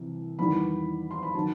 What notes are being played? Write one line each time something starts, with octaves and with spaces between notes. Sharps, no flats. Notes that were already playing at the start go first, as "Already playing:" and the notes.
Already playing: C2 C3 E3
E2 D#3 G3 B3 B5
C6
B5
D#3 F#3 A5